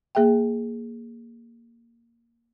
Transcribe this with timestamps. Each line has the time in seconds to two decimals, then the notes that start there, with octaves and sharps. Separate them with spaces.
0.15 A#3 G#4 E5 G5